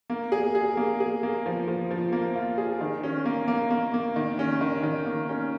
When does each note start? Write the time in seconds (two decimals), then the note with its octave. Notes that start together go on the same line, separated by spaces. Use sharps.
0.10 A#3
0.32 G#4
0.55 G#4
0.77 A#3
1.00 G#4
1.23 A#3
1.46 F3
1.68 F3
1.91 F3
2.12 A#3
2.35 F4
2.58 G#4
2.81 D#3
3.03 C#4
3.25 A#3
3.48 A#3
3.70 A#3
3.94 A#3
4.16 D#3
4.39 C#4
4.61 D#3
4.83 D#3
5.06 A#3
5.29 C#4